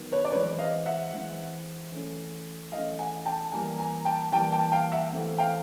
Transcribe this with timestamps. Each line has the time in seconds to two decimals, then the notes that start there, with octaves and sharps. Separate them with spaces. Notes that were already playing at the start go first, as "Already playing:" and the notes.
Already playing: D#3 F#3 B3
0.12 B4 C#5
0.25 D5
0.32 E3 G#3 C4 B4 C#5
0.59 D#5 F5
0.86 E5 F#5
1.13 E3 G#3 C4
1.92 E3 A3 C#4
2.72 E3 A3 C#4 D#5 F5
2.99 F#5 G#5
3.26 G5 A5
3.52 E3 G3 A#3 G#5 A#5
3.78 G#5 A#5
4.05 G5 A5
4.32 E3 G3 A#3 G5 A5
4.53 G5 A5
4.72 F5 G5
4.92 E5 F#5
5.13 E3 A3 C4
5.38 F5 G5